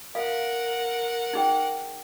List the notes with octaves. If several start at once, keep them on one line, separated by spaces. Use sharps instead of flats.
A#4 F5 F#5
D#4 G#4 G5